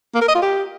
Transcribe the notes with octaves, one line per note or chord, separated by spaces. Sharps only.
A#3
A#4
D#5
F4
G4